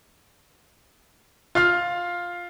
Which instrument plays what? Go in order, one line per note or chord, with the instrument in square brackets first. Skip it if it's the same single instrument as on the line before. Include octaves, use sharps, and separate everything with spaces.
[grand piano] F4 F5 F6